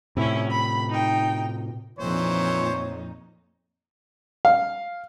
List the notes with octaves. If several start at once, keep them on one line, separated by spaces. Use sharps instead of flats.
A2 C3 C#4 E4
B5
D#4 G5
F2 A#2 E3 D#4 C5 C#5
F5